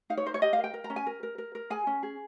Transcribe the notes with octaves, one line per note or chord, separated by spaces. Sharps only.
D#4 F5
C#5
A#4 C5
C#5
G4 D#5
F5
A#4
G5
A#4
A#5
C#4
G#5
A#4
A#4
A#4
A#4
G#4 G#5
C#4
G#4